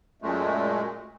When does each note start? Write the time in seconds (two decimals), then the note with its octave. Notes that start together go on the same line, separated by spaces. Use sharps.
0.22 F#2 A#2 G#3 A3